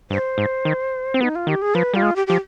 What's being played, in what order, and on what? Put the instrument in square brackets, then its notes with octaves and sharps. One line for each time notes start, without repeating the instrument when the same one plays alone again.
[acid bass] G2 [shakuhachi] C5
[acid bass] G#2
D#3
C4
[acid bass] B3 [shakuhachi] D#4
[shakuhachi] F4
[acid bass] D#3 [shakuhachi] G4
[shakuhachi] G#4
[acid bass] F3 [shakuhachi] B4
[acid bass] G3 [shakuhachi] F4
[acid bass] G#3
[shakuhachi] G4
[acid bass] F3 [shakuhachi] G4